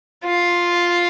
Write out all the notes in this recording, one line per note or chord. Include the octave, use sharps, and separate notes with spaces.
F4